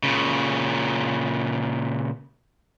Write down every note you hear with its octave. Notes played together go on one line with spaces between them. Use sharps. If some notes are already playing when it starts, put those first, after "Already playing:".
A#2 C#3